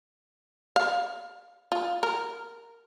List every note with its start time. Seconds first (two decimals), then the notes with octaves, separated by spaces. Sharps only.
0.76 F5
1.72 F4
2.03 A#4